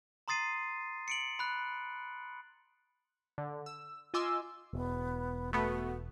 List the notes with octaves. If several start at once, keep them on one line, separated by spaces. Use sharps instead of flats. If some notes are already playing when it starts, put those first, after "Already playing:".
A#5 C6 D#6 A6 C7 D#7
C#7 D7 F#7
B5 F#6
D3
E6
F4 D#5 G#5 C6 D6 E6
E1 B3
A3 B3 F#4